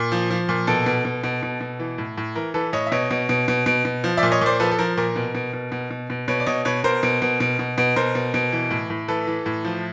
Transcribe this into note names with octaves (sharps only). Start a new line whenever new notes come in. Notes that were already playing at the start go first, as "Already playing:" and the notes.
Already playing: A#2
F3
F3
A#2
B2 A4
B2
B2
B2
B2
B2
E3
A2
A2
E3 A#4
E3 A4 B4
A2 C#5 D#5
E5
B2 C#5 D#5
B2
B2
B2
B2
B2
F3
D5 E5
A#2
C#5 D#5
A#2 C5 D5
F3 A4 B4
A4
F3 A#4
A#2 A#4
B2
B2
B2
B2
B2
B2
B2 B4 C#5
D5
B2 C#5 D#5
B2 B4 C#5
B2 A#4 C5
B2
B2
B2
B2
B2
B2 A#4 C5
B2
B2
E3
A2
A2
E3 A4 B4
E3
A2
F3